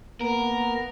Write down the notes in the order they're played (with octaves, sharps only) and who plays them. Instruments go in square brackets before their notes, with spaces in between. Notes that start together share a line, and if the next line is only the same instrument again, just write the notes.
[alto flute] A#3 [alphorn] B3 [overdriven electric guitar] A#4